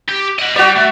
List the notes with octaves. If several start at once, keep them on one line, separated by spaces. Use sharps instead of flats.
G4
D#5 F#5
G3 F#4 D5
A3